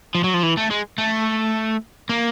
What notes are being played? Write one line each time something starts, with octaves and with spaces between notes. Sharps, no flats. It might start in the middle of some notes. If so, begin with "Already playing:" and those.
F3
F#3
F3
E3
A3
G#3
A3
A#3